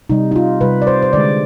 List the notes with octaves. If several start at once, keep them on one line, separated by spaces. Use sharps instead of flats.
C3 G3 D#4
D#4
F4
C3 G3 B4
D5
C5
C5
D3 G#3 D5